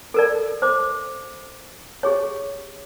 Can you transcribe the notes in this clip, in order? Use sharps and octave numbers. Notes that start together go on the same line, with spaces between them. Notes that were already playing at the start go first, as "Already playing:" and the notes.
A4 A#4 D5
C5 D6
G4 G#4 C#5